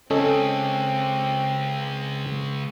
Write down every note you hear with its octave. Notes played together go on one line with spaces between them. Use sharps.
C#2 C4 C#4 A4 D#5